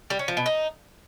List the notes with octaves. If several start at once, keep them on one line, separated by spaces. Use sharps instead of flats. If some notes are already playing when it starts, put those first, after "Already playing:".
G3
C#4
F3
B2
D#4